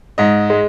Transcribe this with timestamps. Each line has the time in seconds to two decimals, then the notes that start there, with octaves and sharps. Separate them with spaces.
0.18 G#2 D#5
0.50 G#3